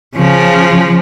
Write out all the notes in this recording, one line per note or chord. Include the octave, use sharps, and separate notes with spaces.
C#3 F3